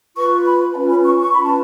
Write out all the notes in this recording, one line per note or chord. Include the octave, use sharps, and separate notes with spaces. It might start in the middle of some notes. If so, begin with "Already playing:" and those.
F4 B4 C#6
B5
C#4 F4 B4 A5
B5
C#6
C#6
C#4 F4 B4 B5
A5